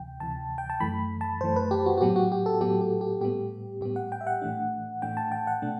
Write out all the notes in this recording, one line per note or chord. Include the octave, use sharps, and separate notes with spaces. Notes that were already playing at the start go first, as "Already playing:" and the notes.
Already playing: D2 C3 E3 G5
D2 C3 E3 A5
G5
A5
F#2 E3 A3 B5
A5
F#2 E3 A3 C5
B4
G4
F#4
F#4
A2 F#3 B3 G4
F#4
G4
A4
A2 F#3 B3 G4
G4
G4
A2 G3 B3 G4
A2 G3 B3 G4
F#5
G5
E5
F#5
A2 E3 A3 D4
A2 E3 A3 D4 G5
A5
G5
F#5
B2 A3 D4